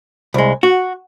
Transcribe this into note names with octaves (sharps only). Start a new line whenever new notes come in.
C2 G#3
F#4